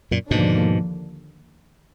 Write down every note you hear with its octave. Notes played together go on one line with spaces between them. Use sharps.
F#2 A#2
D#2 G#2 B2 D3 F3 A#3 D4